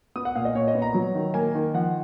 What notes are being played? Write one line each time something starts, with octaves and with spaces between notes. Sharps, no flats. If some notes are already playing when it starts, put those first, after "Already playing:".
B3 D#6
F#5
A#2 F5
D#5
A#2 C#5
D#5
B3
A#5
F#3
D#3
A#3 G#5
D#3
F3 F#5